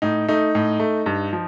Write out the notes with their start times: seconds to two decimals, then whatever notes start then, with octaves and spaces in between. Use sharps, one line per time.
0.02 A2 D#4
0.28 A3 D#4
0.55 A2
0.80 A3
1.06 G2
1.33 F3